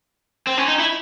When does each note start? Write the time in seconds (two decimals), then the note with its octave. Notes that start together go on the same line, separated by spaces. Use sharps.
0.47 C4
0.58 C#4
0.68 D#4
0.79 E4